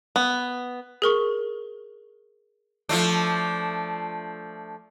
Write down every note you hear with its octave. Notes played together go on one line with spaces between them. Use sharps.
B3
G#4 A#4 C#6
F3 A3 D4